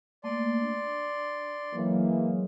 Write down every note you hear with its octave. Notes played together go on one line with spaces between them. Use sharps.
A3 A#3 D5 C6
D4
E3 F#3 G#3 A#3 C#5